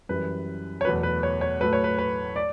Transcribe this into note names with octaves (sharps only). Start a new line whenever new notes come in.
F#2 E3 G3 B4
C#5
E2 B2 F#3 A3 B4
B4
C#5
C#5
A2 F#3 A3 B4
C#5
B4
B4
D5